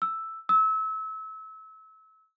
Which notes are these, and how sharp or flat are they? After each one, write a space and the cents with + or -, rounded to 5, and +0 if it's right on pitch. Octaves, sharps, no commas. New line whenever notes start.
E6 +0
E6 -30